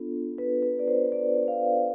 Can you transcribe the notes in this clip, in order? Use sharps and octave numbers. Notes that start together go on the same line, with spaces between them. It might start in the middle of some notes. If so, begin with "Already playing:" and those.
Already playing: B3 D4 F4 A4
B4
B4
D5
C5
D5
F5